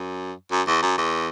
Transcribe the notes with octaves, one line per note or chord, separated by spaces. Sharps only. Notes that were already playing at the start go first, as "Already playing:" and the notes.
Already playing: F#2
F#2
E2
F#2
E2